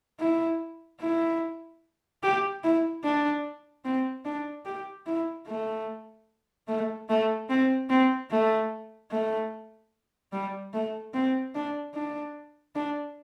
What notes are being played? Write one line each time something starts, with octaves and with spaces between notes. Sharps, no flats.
E4
E4
G4
E4
D4
C4
D4
G4
E4
A3
A3
A3
C4
C4
A3
A3
G3
A3
C4
D4
D4
D4